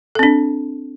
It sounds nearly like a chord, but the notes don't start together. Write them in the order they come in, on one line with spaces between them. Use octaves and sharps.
A4 C4 D4